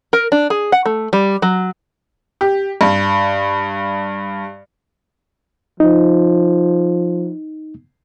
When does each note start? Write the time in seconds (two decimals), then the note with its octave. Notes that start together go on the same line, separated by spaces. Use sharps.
0.13 A#4
0.32 D4
0.50 G#4
0.72 F#5
0.86 A3
1.13 G3
1.42 F#3
2.41 G4
2.81 G2
5.80 F3 D#4